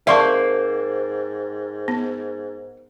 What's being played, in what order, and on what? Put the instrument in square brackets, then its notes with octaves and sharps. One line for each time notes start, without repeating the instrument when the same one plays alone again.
[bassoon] G#2 [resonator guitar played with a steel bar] A#3 C4 [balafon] D5 A5 [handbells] E5 C6 C#6
[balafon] B3